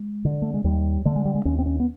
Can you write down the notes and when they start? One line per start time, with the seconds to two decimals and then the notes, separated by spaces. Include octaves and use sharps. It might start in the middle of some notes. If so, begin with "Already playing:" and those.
Already playing: G#3
0.25 D3
0.42 A3
0.54 G#3
0.64 D#2 G3
1.05 D3 A3
1.16 G#3
1.25 G3
1.35 G#3
1.45 D#2 C#4
1.59 C4
1.66 C#4
1.80 B3